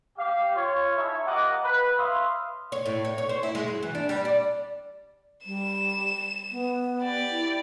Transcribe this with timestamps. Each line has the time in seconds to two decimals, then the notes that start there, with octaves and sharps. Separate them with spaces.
0.18 G4 F5
0.55 F4 C#5
0.96 D#4 E4 G#4 C#5 E5 A5
1.26 A#3 F4 G4 D#5 F#5 D6
1.64 B4
1.98 B4 C#5 E5 F5 C6 D#6
2.72 C#5
2.86 A2
3.05 C#5
3.18 C#5
3.29 C5
3.43 E4
3.55 G#3
3.68 F#2
3.83 E3
3.95 D4
4.09 G3
4.25 D5
5.46 G3 E7
6.52 B3
7.01 G4 D5
7.31 E4